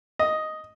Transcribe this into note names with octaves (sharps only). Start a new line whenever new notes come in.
D#5